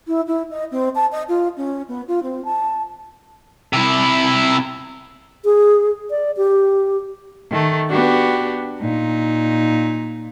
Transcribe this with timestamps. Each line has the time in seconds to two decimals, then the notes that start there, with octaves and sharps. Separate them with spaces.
0.07 E4
0.27 E4
0.51 D#5
0.72 C4
0.95 A5
1.12 D#5
1.29 F4
1.57 C#4
1.88 B3
2.08 F4
2.23 C4
2.45 A5
3.73 C3 E4
5.45 G#4
6.10 D5
6.37 G4
7.50 D#3 A3
7.90 B3 D4 F#4 G4
8.80 A#2 D#4